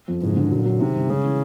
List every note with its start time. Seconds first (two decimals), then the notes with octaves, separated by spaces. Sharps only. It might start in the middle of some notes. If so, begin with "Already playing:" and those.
0.08 F2
0.22 F#1 G#2
0.36 D3
0.51 A#2 F#3
0.65 F#3
0.80 C3 D#3
0.94 G1
1.09 C#3 G#3
1.24 E3